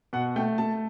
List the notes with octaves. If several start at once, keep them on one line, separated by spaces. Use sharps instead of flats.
B2 F#5
A3 G5
A3 A5